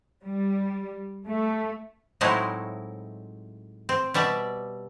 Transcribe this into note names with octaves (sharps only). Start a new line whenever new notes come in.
G3
A3
A2 F#3 G#3 C4 D#4 E4
C4
B2 G3 D5 E5